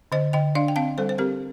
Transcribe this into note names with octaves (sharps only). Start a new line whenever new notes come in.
D3 C5 D#5
D3 D#5 G5
D4 D5 F5
G5
C4 F5 A5
G3 A4 C5
C5
C4 G4 A#4